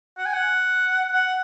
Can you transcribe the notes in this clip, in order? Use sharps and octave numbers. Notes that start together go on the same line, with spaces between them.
F#5
G#5
F#5
F#5